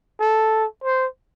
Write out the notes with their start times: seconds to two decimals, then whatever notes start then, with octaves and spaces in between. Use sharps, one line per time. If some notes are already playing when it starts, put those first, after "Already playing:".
0.20 A4
0.84 C5